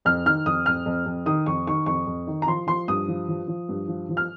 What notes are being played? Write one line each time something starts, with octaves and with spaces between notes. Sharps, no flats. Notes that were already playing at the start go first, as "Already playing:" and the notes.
F2 F6
D#3 F6
F2 D#6
F2 F6
F2
F2
D#3 D#6
F2 C#6
D#3 C#6
F2 C#6
F2
D#3
A#5
F3 C6
F3 C6
G2 D#6
F3
F3
F3
G2
F3
F3
F6